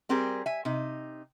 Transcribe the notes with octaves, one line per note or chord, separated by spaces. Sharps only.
G3 C4 G4 G#4 A#4
E5 G#5
C3 D#4